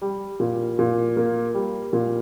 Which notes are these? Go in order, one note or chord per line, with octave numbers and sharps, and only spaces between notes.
G3
A#2
A#2
A#3
G3
A#2